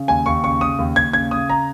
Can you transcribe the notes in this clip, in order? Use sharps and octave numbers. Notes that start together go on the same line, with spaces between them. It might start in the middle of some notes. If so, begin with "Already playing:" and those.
Already playing: C#3
D#2 G#5
D#2 C#6
C#3 C#6
C#3 D#6
D#2
D#2 G#6
C#3 G#6
C#3 D#6
A#5